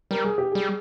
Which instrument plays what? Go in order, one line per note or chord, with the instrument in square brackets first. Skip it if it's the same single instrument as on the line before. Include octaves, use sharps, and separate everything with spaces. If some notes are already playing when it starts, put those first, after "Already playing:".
[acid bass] G3 [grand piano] A#4
[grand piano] G#4
G4
[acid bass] G3 [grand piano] G#4